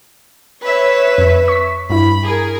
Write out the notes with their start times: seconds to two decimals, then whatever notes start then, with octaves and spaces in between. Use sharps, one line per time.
0.63 B4 C#5 E5
1.18 F2
1.48 C#6 B6
1.90 G2 E4 B5
2.23 G#4 A#4